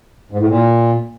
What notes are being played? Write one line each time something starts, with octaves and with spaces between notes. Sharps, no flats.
G#2
A2
A#2